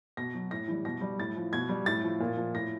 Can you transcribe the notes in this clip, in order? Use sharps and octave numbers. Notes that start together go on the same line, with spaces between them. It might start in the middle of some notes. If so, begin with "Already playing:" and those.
B2 A#6
F#3
A2 A#6
E3 G3
B2 A#6
G3
A2 A6
F3
B2 G#6
G3
A2 A6
F3
A#2
F3
A2 A#6